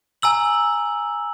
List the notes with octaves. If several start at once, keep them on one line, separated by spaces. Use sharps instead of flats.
G#5 A#5 E6 F#7